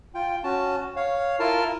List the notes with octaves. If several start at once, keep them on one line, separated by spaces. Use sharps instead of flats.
F4 G5
C#4 F#4 A5
C#5 F5
E4 F4 A#4 A5 F6